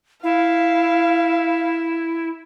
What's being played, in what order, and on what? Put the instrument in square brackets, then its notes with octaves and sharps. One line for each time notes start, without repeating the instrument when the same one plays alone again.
[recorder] E4 [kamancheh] F5